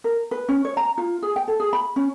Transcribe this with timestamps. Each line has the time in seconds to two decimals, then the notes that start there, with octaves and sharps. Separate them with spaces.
0.04 A#4
0.31 B4
0.49 C#4
0.65 C#5
0.77 A#5
0.98 F4
1.22 G#4
1.36 G5
1.48 A4
1.60 G#4
1.73 B5
1.96 C#4